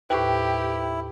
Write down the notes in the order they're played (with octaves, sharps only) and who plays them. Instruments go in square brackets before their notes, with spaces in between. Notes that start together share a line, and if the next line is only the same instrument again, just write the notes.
[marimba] D#2 A2 [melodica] E4 [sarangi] G4 [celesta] B4 C5 G5